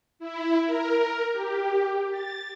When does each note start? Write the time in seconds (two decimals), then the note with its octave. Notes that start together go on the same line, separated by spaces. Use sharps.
0.19 E4
0.65 A#4
1.33 G4
2.11 A6